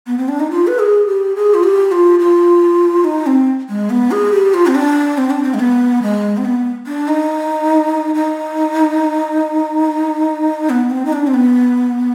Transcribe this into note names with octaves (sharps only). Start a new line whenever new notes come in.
B3
C4
D4
D#4
F4
B4
G#4
G4
G#4
F4
G4
F4
F4
D#4
C4
G#3
B3
G#4
G4
F4
C4
D4
C4
D4
C4
G#3
B3
G#3
C4
B3
D4
D#4
D#4
B3
C4
D#4
D4
C4
B3